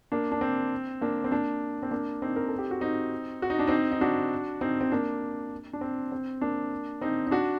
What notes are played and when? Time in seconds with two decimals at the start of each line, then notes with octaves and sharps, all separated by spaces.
0.12 A#3 D4
0.32 D4
0.41 C4
1.01 A#3 D4
1.24 C4
1.31 A#3 D4
1.83 C4
1.91 A#3 D4
2.22 C4 D#4
2.36 A#4
2.48 A4
2.58 G4
2.71 F#4
2.81 C4 D#4
3.42 F#4
3.50 D#4
3.59 D4
3.67 C4 D#4
3.92 D#4
4.01 D4 F#4
4.61 C4 D#4
4.81 C4
4.92 A#3 D4
5.73 D4
5.81 C4
6.12 C4
6.41 A#3 D4
7.01 C4 D#4
7.27 D#4
7.31 D4 F#4